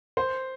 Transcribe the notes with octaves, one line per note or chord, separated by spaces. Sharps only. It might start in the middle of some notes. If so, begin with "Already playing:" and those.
C5